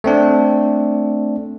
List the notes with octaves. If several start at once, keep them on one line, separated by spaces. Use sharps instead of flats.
A3 C4 D4